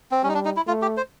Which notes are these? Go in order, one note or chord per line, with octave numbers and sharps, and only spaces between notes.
C4
G3 C#4
D#4
D4
D#4
E4
A3 F4
G4
C5